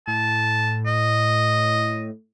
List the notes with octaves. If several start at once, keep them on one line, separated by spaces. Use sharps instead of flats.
A2 A5
D#5